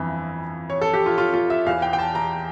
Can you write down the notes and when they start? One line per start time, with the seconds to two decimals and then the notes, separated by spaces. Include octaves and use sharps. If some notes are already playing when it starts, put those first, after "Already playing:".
Already playing: G1 F2 E3
0.70 C#5
0.81 A4
0.94 G4
1.06 F4
1.18 F4
1.34 F4
1.50 E5
1.66 E2 E3 F5
1.82 G5
1.93 G5
1.99 A5
2.15 A#5